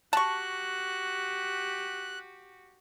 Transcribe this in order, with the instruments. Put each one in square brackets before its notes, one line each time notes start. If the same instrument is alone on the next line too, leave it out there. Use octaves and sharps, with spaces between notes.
[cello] F#4 G4 [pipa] A5 C#6 [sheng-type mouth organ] F#6